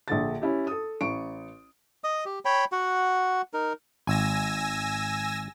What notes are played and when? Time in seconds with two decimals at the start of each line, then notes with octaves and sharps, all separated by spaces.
0.08 A#1 D3 A6
0.42 C#4 E4 G4
0.67 A4 D#6
1.01 A1 C#6 D7
2.04 D#5 D#6
2.26 G4
2.45 C#5 G5 B5
2.72 F#4 F#5
3.54 D#4 A#4
4.07 G#1 G#5 E6 A#6